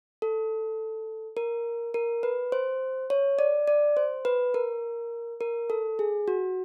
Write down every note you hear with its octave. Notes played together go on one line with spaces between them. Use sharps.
A4
A#4
A#4
B4
C5
C#5
D5
D5
C5
B4
A#4
A#4
A4
G#4
F#4